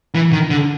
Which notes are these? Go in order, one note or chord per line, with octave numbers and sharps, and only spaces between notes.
E3
D#3
D3